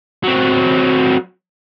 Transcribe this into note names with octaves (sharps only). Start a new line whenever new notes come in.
F#3 C4